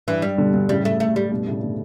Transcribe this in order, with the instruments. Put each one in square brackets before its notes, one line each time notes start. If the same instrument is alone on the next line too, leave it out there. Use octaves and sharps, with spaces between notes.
[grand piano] G2 [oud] E3
[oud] G3
[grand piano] B2 D3
G2 B2
[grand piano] A2 C#3 [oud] G3
[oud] A3
A3
G3
[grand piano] G2 B2
A2 C#3
B2 D3